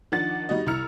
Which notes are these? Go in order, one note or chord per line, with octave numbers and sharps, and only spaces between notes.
D#3 F3 D4 D#4 F#5 A6
G3 D#4 F#4 D#5
C2 E4 A#5 E6 F6 C#7